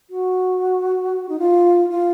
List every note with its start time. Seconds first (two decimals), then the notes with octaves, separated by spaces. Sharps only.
0.10 F#4
1.29 D#4
1.39 F4
1.90 F4